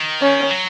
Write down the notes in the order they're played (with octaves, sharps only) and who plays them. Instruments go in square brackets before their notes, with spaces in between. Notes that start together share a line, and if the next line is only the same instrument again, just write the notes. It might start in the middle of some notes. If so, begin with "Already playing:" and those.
Already playing: [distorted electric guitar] D#3
[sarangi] C#4
[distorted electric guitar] F#3